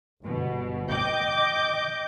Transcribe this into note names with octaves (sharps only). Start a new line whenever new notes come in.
G1 B2
D#5 G5 D6 G6